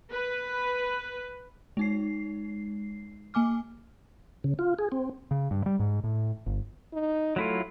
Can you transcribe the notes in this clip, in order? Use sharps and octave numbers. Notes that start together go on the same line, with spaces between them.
B4
G#3 D#4 C7
A#3 G#5 D6 F6
C#3
F4
G#4
C4
C#3
G2
G3
G#2
A2
G1
D#4
F#3 A3 E4 F4